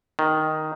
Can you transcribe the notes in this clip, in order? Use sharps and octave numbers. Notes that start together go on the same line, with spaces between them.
D#3